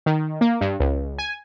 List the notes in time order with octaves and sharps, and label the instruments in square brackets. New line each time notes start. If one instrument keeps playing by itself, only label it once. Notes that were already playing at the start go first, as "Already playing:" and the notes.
[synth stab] D#3
A#3
G2
C#2
G#5